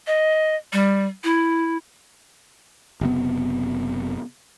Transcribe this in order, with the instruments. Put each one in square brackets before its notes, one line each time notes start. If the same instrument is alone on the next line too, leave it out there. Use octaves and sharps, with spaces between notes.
[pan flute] D#5
G3
E4
[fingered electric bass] F#1 C3 B3